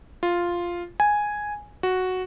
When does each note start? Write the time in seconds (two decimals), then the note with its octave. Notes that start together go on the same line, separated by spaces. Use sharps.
0.23 F4
1.00 G#5
1.83 F#4